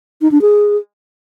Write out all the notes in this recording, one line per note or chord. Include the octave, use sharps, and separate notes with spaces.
D#4
D4
G#4